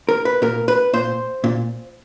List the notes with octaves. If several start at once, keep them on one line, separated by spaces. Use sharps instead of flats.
A#4
B4
A#2 A#4
B4
A#2 C5
A#2